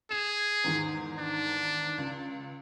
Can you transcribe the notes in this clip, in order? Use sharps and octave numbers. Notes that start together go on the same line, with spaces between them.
G#4 E7
E2 G#2 D#3
D4
C#2